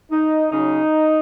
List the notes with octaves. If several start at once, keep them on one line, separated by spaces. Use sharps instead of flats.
D#4
C#3 F#3 D#4